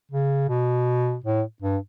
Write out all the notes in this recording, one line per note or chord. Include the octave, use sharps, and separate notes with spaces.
C#3
B2
A2
G2